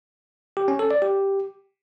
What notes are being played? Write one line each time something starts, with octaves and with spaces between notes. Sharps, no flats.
G4
C#4
A4
D5
G4